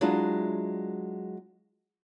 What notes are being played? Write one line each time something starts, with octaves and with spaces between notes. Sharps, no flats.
F#3 G#3 D4 E4 F4